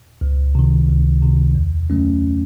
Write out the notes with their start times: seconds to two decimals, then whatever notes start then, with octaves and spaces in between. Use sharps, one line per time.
0.21 C#2
0.55 C3 D#3
0.89 C#2
1.22 C3 D#3
1.55 E2
1.90 C#3 F#3 A3 C#4